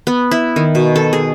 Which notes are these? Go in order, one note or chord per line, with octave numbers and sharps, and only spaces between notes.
B3
E4
D#3
B2
A4
G#4